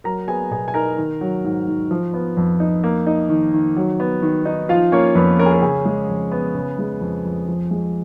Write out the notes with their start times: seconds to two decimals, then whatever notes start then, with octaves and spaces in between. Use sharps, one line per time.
0.04 F#3 A#4 A#5
0.28 B3 G#4 G#5
0.51 B2 G#4 G#5
0.68 G#5
0.74 D#4 A#4 A#5
0.98 D#3
1.21 F#3
1.44 G#2
1.68 G#2
1.91 F3
2.14 B3
2.37 F2
2.60 D#4
2.84 A#3
3.07 D#4
3.29 D#3
3.54 D#3
3.76 F#3
4.00 B3
4.22 D#3
4.45 D#4
4.69 F3 F4 F5
4.92 A#3 C#4 C#5
5.15 F2 B3 B4
5.39 C#4 A#4
5.46 G#4
5.52 A#4
5.62 C#3 G#4
5.85 G#3
6.09 F2
6.32 B3
6.55 C#3
6.79 G#3
7.01 F2
7.25 F2
7.48 F3
7.71 G#3